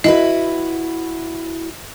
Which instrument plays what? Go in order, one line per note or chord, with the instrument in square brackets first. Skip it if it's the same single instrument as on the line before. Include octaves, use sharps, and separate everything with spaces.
[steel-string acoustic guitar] E4 F#4 B4 [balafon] D#5